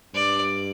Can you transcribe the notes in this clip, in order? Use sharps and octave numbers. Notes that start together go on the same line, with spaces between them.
G2 D5